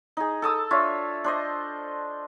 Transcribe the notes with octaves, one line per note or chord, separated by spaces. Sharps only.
D#4 G#4
A4 A5 D#6 E6
D4 F4 C#5 E5
D4 C5 D#5